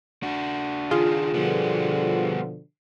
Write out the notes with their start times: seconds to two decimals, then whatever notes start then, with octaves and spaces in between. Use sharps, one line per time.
0.23 D4 F#4
0.91 D#3 D4 F4 G#4
1.34 B2 D3 F3 G3 B3